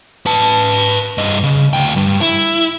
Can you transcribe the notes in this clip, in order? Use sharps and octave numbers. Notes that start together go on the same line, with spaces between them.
B4 A5
G2 D#5
C#3
D2 G5
G2
E4